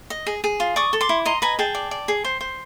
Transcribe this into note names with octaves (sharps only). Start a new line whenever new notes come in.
D#5
G#4
G#4
F4
D5 C#6 D#6
A4
C6 D6
E4
D#5 A#5 C6
B4 G#5 A#5
G#4 G5 A5
D5
D5
G#4
C5
C5